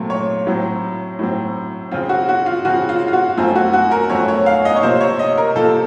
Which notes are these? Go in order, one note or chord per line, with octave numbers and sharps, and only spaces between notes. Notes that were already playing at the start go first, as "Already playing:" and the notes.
Already playing: A#2 F#3 A3 C4
C#5
A2 F#3 C4
A2 F#3 C4
C#3 F3 C4 F4
F#4
F#4
F4
C#3 F3 C4 F#4
F4
F4
F#4
F#2 F3 A3 C4 F4
F#4
F#4
A#4
F#2 F3 A3 C4 C#5
C#5
F5
D#5
C#5
C3 F3 A#3 C5
C#5
D#5
A#4
C3 F3 A#3 A4